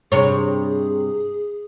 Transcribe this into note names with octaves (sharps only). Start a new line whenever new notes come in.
G2 C3 G#4 C#5